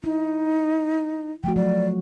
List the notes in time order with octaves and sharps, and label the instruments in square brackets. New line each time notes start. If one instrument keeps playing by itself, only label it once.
[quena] D#4 [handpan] E4
[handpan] F3 A3 F#4 [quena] G5
[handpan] F#3 [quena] D5